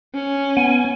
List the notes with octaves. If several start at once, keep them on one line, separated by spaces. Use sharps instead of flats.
C#4
B3 G#5